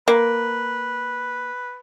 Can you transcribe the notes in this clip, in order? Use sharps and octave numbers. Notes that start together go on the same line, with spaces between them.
A#3 B4